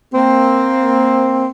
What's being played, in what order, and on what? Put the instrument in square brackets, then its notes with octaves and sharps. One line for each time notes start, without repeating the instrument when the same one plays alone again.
[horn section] A#3 C4